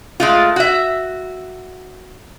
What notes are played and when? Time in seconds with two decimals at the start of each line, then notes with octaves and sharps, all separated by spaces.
0.20 G#3 A3 F4
0.56 F#4 E5